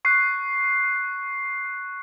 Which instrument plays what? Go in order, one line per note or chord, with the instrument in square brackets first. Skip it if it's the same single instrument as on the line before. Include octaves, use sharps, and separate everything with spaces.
[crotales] C#6 F#6 C7